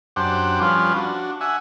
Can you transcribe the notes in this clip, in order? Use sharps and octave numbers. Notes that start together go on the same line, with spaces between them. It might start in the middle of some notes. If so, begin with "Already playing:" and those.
F#2 D4 G4 C5 F#5
F3 G3 C#4 F4 B4
D4 F#4
E5 F#5 G#5